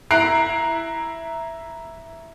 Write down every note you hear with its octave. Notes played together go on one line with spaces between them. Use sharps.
E4 A#5 F#6 C7 D7